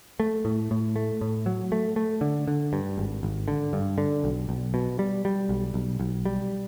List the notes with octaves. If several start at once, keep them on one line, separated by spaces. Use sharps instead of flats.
A3
A2
A2
A3
A2
F#3
A3
A3
D3
D3
G2
G#1
G#1
D3
G2
D3
B1
B1
B2
G3
G3
B1
B1
B1
G3